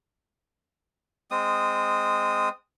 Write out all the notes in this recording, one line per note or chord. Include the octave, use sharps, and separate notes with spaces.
G#3 C4 D#6